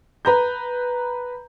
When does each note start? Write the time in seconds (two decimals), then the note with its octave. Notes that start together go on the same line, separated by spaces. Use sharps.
0.25 B4 A#5 G6